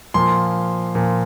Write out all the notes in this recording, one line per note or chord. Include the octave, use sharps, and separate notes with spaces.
A#2 F3 C6
A#2 F3